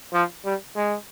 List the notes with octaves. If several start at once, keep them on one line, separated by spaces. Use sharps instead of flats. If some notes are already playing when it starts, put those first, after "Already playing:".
F3
G3
G#3